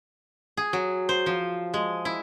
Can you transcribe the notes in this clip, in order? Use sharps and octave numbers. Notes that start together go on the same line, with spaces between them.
G#4
F#3
C5
F3
G#3
E4